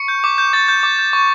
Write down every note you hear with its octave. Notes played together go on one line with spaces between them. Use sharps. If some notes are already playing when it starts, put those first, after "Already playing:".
Already playing: C#6 C#7
G6
D6
G6
D6 A6
G6
D6
G6
C#6